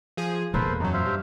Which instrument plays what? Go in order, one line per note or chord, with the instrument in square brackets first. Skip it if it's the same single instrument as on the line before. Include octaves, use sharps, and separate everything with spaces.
[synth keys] F3 G#4
[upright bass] E2 A#2 [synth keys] A#3 [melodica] A4 B4 C5
[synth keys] F#2 F#3 [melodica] D#4
[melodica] C5 E5 F5
[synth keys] G2